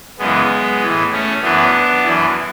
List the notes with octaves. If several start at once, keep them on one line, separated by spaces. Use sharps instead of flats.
F#2 C#3 E3 G#3 B3
A2 E3
A3 C#4
F#2 E3 B3 D4
F#2 E3